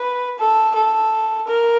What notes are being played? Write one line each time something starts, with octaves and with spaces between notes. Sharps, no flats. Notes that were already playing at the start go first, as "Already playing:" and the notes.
Already playing: B4
A4
A4
A#4